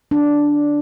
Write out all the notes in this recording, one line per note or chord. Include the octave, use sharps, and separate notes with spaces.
D4